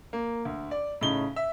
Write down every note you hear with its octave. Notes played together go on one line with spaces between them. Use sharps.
A#3
D2
D5
A2 C#3 D#4 G7
E5